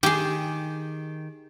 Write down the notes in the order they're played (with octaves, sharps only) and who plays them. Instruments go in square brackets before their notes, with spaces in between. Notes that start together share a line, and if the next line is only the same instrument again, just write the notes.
[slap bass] D#3 [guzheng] G4 G#4